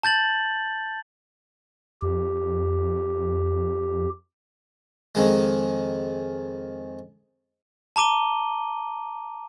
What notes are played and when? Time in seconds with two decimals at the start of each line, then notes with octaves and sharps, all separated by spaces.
0.03 A5 G6 A6 F#7
2.02 F2 G4
5.15 F2 D#3 G#3
7.96 A5 A#5 D6 D#7 G7